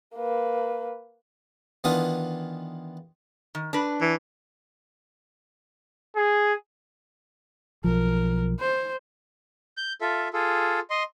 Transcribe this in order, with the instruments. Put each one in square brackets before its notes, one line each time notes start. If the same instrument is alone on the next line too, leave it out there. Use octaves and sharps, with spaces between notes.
[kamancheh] A#3 B4
[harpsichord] D#3 E3 B3 D4 F4 D#6
[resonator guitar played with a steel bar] D#3
D4 B4
[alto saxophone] E3
[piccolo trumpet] G#4
[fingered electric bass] B1 F3 [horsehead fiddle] A#4
[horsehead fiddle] C5
[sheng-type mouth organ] G6
F4 A4 E5
F4 G#4 A4
D#5 C6